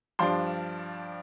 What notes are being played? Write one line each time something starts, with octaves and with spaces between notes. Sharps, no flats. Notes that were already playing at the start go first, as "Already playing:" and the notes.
G2 F3 D4 C6